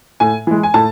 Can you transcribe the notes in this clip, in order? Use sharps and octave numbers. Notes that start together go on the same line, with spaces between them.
A2 G#5
E3 G#3
G#5
A2 A5